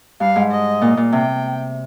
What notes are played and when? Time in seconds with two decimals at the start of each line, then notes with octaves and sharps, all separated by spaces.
0.20 G2 F5
0.36 G#2
0.51 D#5
0.81 A#2
0.97 A#2
1.12 C3 G5